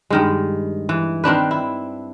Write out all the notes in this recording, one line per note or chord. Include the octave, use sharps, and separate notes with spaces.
G2 D#3 G#3
E3
D#3 C4 D4 B4
E4